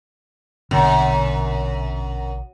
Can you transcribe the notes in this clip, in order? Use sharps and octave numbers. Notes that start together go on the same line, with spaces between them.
A#1 F#2 B2 D3